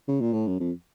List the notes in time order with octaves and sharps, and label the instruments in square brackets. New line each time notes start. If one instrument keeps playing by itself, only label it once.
[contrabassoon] C#3
A#2
A2
F#2
F2